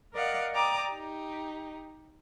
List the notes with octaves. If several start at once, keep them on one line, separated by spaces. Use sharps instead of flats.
A#4 D5 D#5 F5 F#5
D5 G5 A#5 D6 D#6
D#4 G4